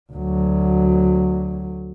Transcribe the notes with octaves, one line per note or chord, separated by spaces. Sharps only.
D2 F#3